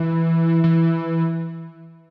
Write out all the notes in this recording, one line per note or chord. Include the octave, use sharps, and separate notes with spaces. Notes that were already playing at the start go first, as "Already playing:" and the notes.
Already playing: E3
E3